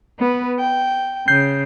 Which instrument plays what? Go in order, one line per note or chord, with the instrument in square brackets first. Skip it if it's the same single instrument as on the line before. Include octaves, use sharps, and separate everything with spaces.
[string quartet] B3 B4
G5
[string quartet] C#3 [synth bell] G6 C7